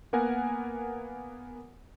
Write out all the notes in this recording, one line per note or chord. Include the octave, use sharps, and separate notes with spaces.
A#3 B3 A#4 F#5 G#5